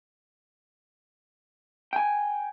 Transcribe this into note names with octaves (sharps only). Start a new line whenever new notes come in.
G5 G#5